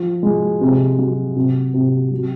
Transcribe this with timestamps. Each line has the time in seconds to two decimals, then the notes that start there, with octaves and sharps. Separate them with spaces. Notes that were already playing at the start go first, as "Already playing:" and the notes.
Already playing: F3
0.23 G#3
0.61 C3
0.98 F#3
1.36 C3
1.74 C3
2.11 F#3